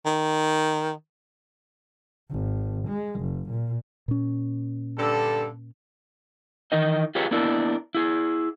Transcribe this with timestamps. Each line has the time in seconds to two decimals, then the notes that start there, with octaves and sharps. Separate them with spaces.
0.05 D#3
2.30 G#1
2.88 G#3
3.21 F#1
3.50 A#2
4.08 A#2 C#4
4.97 G2 D3 A4
6.72 D#3 E3 D#4 A#4 D#5
7.15 F4 G4 G#4 B4 C#5
7.31 A#3 B3 D4 E4 A#4
7.95 E4 G#4